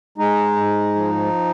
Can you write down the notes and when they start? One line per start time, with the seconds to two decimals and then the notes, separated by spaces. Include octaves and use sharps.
0.18 G#3 D#4
0.56 G#2
0.95 F3